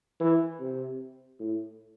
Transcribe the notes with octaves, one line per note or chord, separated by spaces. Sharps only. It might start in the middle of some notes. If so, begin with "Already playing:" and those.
E3
C3
A2